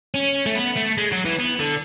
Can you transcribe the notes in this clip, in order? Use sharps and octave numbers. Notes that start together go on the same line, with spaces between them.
C#4
A3
B3
A3
G#3
F#3
E3
B3
D3